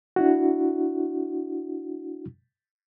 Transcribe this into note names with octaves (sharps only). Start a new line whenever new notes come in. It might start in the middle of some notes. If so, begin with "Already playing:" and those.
D4 E4 F#4